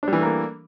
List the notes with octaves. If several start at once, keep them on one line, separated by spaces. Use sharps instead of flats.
E3 G3 A3 A#3 D4